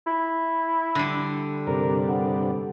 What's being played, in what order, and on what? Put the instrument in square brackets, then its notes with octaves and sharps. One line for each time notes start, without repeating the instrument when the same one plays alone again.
[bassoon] E4
[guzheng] D3 G3
[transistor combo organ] G2 C3 D4 [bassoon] A#4
[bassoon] B3